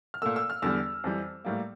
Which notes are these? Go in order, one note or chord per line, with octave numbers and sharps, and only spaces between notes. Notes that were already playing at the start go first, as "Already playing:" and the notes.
F6
A#2 A3 E6
E6
F6
E2 D3 G3 E6
F2 E3 G3
A2 G3 A#3